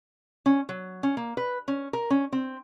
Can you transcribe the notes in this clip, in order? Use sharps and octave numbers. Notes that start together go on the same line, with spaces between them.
C#4
F#3
C#4
A#3
B4
C#4
A#4
C#4
C4